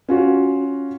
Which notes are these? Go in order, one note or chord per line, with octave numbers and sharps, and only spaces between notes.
C#4 F4 F#4